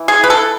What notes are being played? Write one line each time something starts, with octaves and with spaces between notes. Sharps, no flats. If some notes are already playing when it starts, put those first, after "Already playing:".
Already playing: E3
G#4
B4
A4